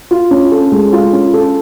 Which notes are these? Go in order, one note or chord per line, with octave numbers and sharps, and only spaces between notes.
F4
C#4
A4
G#3
F4
C#4
A4